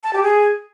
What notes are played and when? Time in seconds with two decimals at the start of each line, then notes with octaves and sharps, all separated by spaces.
0.03 A5
0.13 G4
0.23 G#4